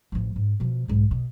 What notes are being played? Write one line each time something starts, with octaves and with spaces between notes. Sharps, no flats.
A1 F3
G#2
B2 F3
B1 G#2
B2